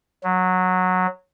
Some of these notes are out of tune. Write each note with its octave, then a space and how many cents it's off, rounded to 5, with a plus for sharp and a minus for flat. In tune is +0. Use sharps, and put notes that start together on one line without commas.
F#3 -10